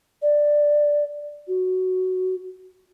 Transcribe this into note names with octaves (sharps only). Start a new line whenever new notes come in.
D5
F#4